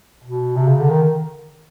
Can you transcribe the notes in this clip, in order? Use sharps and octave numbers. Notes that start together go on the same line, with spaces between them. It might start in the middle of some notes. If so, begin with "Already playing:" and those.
B2
C3
C#3
D3
D#3